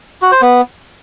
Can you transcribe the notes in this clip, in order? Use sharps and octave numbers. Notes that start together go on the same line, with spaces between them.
F#4
C5
B3